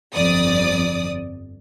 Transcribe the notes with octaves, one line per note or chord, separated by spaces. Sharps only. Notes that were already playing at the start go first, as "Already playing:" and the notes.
G1 F2 D5 D#6